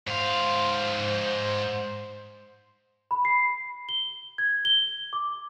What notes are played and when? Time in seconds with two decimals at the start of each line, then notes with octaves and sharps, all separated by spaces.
0.07 G#2 C5 F5
3.11 B5
3.25 C7
3.89 G7
4.38 G#6
4.65 G7
5.13 D6